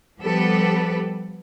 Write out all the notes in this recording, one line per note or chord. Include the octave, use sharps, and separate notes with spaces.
F3 G3 B3 G4 A4 B4